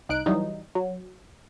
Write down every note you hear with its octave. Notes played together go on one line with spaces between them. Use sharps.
C2 D#4 F#6 D7
E3 F#3 G3 D#4
F#3